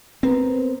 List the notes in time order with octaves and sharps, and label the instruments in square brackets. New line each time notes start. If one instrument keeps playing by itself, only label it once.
[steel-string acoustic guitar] B3 A#4 C5 [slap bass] C4